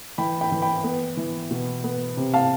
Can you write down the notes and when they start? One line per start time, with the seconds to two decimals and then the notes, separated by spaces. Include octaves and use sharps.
0.18 E3 G5 B5
0.41 G5 B5
0.52 E3
0.62 G5 B5
0.84 B3
1.17 E3
1.51 B2
1.84 B3
2.17 C3
2.34 F5 A5